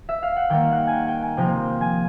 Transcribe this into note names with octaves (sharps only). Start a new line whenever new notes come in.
E5
F5
F#5
D#3 G3 A#3 G5
F#5
G#5
G5
G5
G#5
C3 F3 A#3 G5
G#5